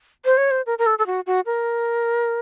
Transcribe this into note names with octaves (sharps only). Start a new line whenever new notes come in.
C5
C#5
C5
A#4
A#4
A4
A4
F#4
F#4
A#4